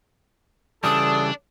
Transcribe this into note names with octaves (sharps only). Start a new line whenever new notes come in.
C#3 E3 G3 D4 A4 D#6